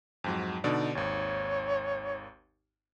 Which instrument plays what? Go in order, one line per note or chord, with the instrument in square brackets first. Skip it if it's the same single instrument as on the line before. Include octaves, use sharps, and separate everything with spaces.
[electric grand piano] F2 G#2 F#3
[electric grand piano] B2 D3 D5 [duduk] D#4
[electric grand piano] G#1 D#2 [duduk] C#5